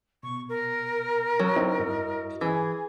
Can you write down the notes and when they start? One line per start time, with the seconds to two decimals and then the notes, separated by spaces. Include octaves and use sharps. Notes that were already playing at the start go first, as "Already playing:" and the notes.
0.23 B2 C#6
0.49 A#4
1.39 F#3
1.56 C4 D#4 E4
1.79 G2 E4 D#5
2.41 E3 G#4